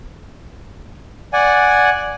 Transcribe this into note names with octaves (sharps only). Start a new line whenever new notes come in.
D5 F#5 G#5